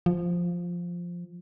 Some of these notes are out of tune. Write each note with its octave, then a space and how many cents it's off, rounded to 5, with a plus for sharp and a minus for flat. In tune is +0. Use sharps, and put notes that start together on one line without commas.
F3 +0